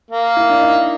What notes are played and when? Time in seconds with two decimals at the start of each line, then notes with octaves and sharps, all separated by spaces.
0.11 A#3
0.37 E4
0.49 D4
0.61 D#4